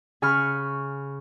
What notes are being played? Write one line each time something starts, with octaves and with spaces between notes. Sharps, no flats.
C#3 G#5 B5 C#6 F6